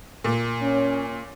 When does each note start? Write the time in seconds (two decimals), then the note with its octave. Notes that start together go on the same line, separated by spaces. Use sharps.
0.24 A#2
0.62 C#4